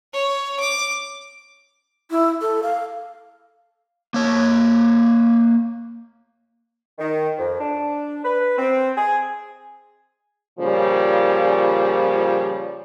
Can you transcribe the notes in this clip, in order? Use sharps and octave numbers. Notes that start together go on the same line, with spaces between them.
C#5
D6
E4
A4
F5
A#3 C#5
D#3
F2
D4
B4
C4
G#4
A#2 C#3 F3 G3